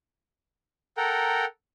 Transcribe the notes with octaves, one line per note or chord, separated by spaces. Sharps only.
A4 A#4 F#5 G5 A#5